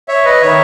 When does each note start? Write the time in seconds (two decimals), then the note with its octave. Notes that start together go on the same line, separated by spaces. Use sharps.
0.08 C#5 E5
0.25 B4 D#5
0.42 D#3 C#5 E5